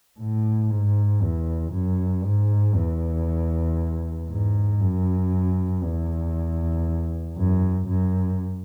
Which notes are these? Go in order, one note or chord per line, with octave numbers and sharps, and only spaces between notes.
A2
G#2
E2
F#2
G#2
E2
G#2
F#2
E2
F#2
F#2